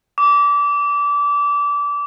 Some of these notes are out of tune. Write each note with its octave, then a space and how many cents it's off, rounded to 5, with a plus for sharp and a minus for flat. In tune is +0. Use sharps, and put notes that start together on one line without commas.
D6 -25